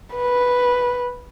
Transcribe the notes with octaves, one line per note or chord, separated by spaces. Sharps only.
B4